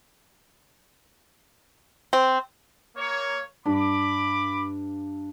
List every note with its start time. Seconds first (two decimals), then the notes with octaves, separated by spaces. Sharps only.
2.13 C4
2.95 A#3 C#5
3.66 G2 D4 B5 D6